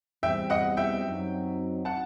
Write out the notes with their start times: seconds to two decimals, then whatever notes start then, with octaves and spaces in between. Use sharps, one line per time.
0.23 E2 B2 G3 C4 E5 G5
0.50 D#5 F#5
0.77 E5 G5
1.04 F#2 F#3 C4 D#4
1.85 F#5 A5